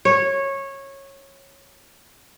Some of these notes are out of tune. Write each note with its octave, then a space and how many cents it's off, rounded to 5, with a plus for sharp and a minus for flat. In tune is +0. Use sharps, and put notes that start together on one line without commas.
C#5 -15